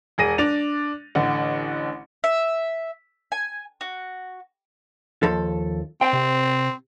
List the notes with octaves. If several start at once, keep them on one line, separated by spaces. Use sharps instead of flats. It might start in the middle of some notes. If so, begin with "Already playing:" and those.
E1 G#4 A#6 D#7
D4 A6 F7
A1 D3 F#5
E5
G#5
F#4
D#2 F3 A4
C4 G5
C3